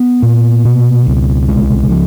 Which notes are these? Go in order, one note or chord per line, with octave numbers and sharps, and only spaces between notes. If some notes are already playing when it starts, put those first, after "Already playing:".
Already playing: B3
A#2
B2
C#2
B1 G#3
F3